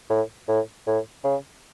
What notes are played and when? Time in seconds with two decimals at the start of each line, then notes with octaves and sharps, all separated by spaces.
0.10 A2
0.48 A2
0.87 A2
1.24 C#3